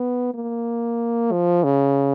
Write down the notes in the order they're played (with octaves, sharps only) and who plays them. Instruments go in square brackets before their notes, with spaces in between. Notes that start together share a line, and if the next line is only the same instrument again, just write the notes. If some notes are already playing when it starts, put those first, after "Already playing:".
Already playing: [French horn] B3
A#3
F3
C#3